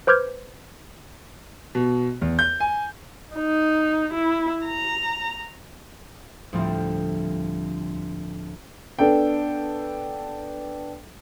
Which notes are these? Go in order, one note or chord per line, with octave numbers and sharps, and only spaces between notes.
B4 C5 D6 F6 G6 G#6
B2
E2
G6
G#5
D#4
E4
A#5
D2 A2 F3 G3 C4
B3 D4 A4 G5